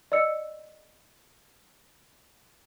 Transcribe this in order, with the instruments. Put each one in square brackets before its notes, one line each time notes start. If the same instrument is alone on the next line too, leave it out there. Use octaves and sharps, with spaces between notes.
[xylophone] D5 D#5 E6 C#7